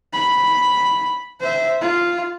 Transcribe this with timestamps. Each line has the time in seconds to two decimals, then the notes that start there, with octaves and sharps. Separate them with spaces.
0.13 B5
1.41 C5 E5
1.81 F4